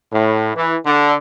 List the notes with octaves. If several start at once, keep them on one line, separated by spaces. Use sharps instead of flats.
A2
E3
D3